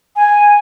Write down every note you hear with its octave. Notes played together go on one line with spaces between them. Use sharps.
G#5